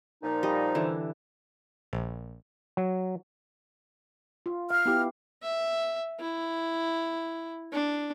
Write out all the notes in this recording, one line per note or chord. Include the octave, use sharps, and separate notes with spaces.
A#2 F3 D#4
G3 D#5
D3 E3
A#1
F#3
F4
F5 F6
B3 E4 G4
E5
E4
D4